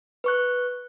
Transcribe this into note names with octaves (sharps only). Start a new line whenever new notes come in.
B4 C#6 F#6